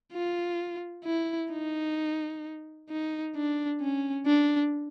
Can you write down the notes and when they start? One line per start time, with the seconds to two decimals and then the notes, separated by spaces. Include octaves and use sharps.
0.13 F4
1.05 E4
1.52 D#4
2.89 D#4
3.36 D4
3.81 C#4
4.26 D4